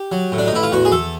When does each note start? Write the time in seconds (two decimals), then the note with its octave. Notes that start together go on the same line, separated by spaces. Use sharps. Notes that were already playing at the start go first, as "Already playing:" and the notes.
Already playing: G4
0.12 F#3
0.32 A2
0.38 D4
0.47 D#4
0.53 A1 E4
0.63 F4
0.72 E2 F#4
0.85 G#4
0.92 E2 A4